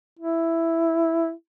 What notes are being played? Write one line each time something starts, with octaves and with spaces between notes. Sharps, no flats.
E4